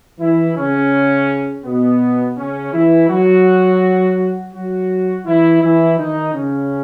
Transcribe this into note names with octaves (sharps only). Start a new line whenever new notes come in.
E3 E4
C#3 C#4
B2 B3
C#3 C#4
E3 E4
F#3 F#4
F#3 F#4
E3 E4
E3 E4
D#3 D#4
C#3 C#4